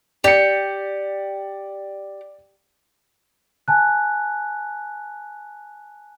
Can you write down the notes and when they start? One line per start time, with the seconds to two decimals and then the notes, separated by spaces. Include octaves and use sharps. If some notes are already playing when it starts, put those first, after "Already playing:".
0.24 G4 D5 C#7
3.68 G#5 A5 F#6